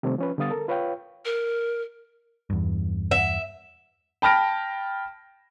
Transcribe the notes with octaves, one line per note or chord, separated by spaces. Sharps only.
C3 D#3 G3 A3 C4
F3 C#4 B4
D3 G3 B3 F5 D#6 A6
A4 A#4
F4 B4 C#5 F5 G5
A#4
E2 G2
E5
G5 A5 B5 F6 A#6 D7